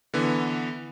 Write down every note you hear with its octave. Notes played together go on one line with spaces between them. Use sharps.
D3 E3 B3